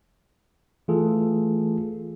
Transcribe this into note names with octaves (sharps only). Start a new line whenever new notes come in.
E3 A3 F4 G#4 A4